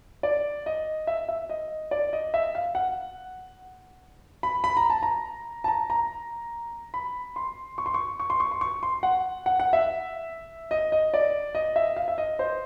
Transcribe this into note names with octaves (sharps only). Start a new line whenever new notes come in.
D5
D#5
E5
E5
D#5
D5
D#5
E5
F5
F#5
B5
B5
A#5
A5
A#5
A5
A#5
A#5
B5
C6
C#6
C6
C#6
C#6
C6
C#6
C6
C#6
C6
F#5
F#5
F#5
E5
D#5
D#5
D5
D#5
E5
F5
E5
D#5
C5